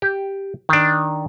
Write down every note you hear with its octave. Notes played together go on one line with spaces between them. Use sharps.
G4
D#3 D4